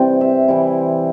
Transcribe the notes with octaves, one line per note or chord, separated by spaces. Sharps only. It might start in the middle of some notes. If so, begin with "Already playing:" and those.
Already playing: C3 E3 G3 C4 D5 G5
E5
E3 G3 E4